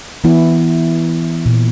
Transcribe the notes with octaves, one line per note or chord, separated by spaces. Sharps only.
E3 B3 E4
A#2